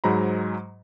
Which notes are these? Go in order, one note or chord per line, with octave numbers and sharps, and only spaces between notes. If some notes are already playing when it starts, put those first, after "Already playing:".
G#2 F#3 G#3 C5 A#5 B5